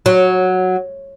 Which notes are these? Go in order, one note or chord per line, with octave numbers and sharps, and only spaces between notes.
F#3